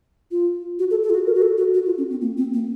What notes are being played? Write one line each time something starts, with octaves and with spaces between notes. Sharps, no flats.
F4
F#4
A4
A4
F4
F#4
A#4
F#4
A4
F#4
F#4
F4
C#4
C4
A#3
C4
A#3